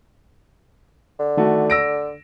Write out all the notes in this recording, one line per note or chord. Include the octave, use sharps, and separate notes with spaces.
D3
D#3 A3 F#4
E6 A#6 D7